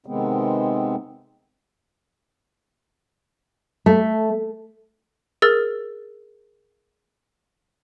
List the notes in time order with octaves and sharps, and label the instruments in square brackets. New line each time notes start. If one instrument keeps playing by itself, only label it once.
[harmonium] C3 D#3 G#3 B3 C4
[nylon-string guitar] A3
[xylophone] G#4 A#4 E6 F6 A6